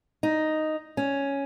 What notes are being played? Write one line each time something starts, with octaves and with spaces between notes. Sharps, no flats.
D#4
C#4